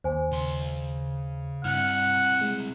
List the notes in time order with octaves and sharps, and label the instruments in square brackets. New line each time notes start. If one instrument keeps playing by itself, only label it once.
[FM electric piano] D#2 [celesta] C5 G#5
[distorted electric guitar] C#3 C6
[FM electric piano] G2 F6 [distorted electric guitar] C4 E4 [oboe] F#5
[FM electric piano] G#3